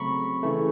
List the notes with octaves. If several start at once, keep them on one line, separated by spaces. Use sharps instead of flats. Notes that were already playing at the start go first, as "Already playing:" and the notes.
Already playing: C#3 F#3 A3 C4 A#5 B5 C#6
C#3 E3 A3